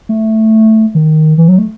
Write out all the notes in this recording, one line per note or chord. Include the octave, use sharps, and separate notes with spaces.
A3
D#3
E3
F#3
A3